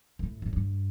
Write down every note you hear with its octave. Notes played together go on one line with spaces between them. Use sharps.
A2
A2
G2